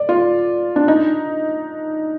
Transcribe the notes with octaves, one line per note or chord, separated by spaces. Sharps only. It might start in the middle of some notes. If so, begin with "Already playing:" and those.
Already playing: D5
F4
D4
D#4